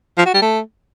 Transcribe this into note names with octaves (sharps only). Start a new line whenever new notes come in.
F3
F#4
G3
A3